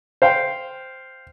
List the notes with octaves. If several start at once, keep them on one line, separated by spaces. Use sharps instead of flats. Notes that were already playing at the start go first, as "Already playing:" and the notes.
C5 F5 G5